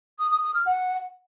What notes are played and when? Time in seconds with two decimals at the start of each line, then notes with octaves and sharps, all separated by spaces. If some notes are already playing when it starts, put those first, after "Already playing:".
0.18 D#6
0.30 D#6
0.42 D#6
0.54 F6
0.66 F#5